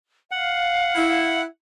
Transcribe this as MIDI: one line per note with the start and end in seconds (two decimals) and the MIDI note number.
0.31 1.39 77
0.31 1.42 78
0.96 1.44 64